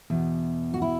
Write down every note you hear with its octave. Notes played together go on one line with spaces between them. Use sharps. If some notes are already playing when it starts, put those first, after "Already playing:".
E2 B2
F#4
E4